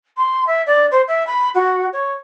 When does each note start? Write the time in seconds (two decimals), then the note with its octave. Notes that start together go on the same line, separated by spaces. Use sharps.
0.16 C6
0.46 E5
0.66 D5
0.91 C5
1.07 E5
1.26 B5
1.54 F#4
1.92 C#5